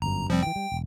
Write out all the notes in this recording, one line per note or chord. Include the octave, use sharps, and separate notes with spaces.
G1 F#2 A#5
F1 F3 G3 C4
B2 E3 G5
G3
E1